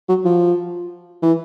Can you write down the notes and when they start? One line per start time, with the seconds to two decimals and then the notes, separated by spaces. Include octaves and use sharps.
0.09 F#3
0.25 F3
1.23 E3